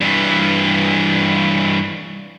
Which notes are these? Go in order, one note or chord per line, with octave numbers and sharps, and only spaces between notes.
G2 E3